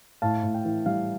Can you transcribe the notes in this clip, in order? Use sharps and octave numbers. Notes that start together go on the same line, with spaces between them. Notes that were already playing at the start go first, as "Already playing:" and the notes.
A2 F5 A5
A2
G5
E3
G3 F5